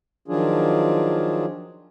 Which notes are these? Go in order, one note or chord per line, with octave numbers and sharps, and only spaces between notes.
D#3 F3 F#3 D4 F4 G#4